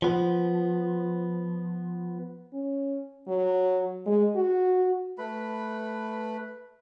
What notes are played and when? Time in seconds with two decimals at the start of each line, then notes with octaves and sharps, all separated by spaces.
0.02 F3 B3
2.53 C#4
3.28 F#3
4.06 G#3
4.35 F#4
5.18 A3 B4 B5